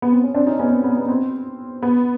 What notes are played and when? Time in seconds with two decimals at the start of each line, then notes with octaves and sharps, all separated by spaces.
0.02 B3
0.12 C4
0.24 C#4
0.34 C4 D4
0.47 C#4 D#4
0.59 B3 C#4
0.71 C4
0.84 B3
0.96 B3
1.08 C4
1.82 B3